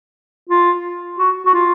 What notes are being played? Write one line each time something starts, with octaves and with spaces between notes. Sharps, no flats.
F4
F#4
F#4
F4